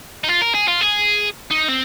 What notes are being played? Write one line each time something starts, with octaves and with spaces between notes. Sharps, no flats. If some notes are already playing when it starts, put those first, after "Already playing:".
D#4
F4
A#4
G#4
F4
G#4
D#4
C4